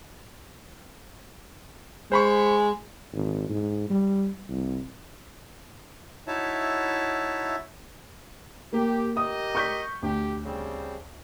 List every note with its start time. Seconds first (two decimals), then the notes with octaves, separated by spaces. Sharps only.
2.12 G#3 C5 B5 C#6
3.13 G#1
3.50 G#2
3.90 G3
4.49 C2
6.27 D#4 E4 F#4 C#5 E5 A5
8.73 A#3 G4
9.17 G4 A#4 D#5 D#6
9.55 C#6 G6 B6
10.03 D2 G4
10.45 C#3 G3 C4